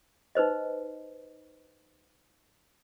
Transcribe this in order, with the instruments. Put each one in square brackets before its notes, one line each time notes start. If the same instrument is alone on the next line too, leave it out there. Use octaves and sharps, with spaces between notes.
[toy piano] D#4 B4 C5 D#5